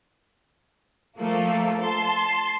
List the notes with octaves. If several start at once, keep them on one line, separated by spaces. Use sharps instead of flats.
F3 A3 A#3 A4
A5 C6